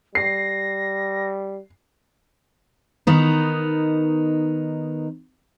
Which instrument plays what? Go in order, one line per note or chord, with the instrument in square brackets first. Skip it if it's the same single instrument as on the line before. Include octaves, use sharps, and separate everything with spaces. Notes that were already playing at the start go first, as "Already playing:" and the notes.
[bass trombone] G3 [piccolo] A#6 [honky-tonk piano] C7
[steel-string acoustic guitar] D#3 B3 D#4